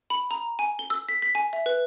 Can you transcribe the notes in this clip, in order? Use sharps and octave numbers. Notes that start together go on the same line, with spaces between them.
B5
A#5
G#5
G7
E6
B6
B6
G#5
E5
B4